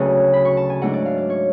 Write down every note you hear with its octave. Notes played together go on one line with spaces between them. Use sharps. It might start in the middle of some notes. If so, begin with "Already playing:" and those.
Already playing: D2 C#3 F#3 B4 A5
B5
C#6
A5
G#5
G#2 F#3 A3 D4 F#5
D5
F5
D5
C#5